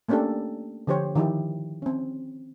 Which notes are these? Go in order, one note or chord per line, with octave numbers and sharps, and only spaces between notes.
A3 A#3 C#4 D4 G4 A4
D3 F3 G4 C5 C#5
D#3 F3 D#4 E4 G4
C4 C#4